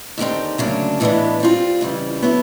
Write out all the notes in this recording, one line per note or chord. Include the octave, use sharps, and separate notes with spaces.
D#2 D3 G3 C4 D#4
D2 C#3 F#3 A#3 D4
A2 E3 G#3 B3 D4
G3 C4 F4
F2 C#3 E3 G3
D3 F#3 B3 E4